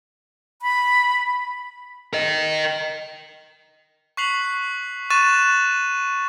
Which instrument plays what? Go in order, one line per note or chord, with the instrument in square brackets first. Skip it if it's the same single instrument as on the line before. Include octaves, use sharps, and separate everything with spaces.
[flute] B5
[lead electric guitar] A#4 D#5
[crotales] C#6 F#6 B6 C7 F7 F#7
C#6 F#6 A6 D#7 E7